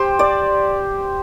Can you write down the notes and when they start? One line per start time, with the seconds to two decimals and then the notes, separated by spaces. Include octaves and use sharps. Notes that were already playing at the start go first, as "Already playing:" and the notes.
Already playing: G4 C5
0.19 D5